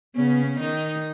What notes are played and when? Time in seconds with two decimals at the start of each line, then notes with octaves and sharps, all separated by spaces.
0.15 C#3 B3 C#4
0.60 D#3 D#4